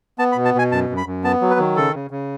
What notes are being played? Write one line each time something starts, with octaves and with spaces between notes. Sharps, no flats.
B3 A5
B5
B2
A5
B2 G#5
F#2 A5
F#2
B5
F#2
B3 A5
F#3
B4
D#3
C#3 A4
C#3
C#3